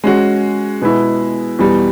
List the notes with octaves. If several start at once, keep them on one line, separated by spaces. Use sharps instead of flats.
G#3 C#4 F#4
B2 G#3 B3 E4
E2 B2 G3